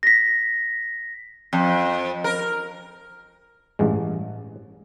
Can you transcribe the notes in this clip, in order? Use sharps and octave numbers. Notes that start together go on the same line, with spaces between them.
A#6 B6
F2
A#4
A1 G2 G#3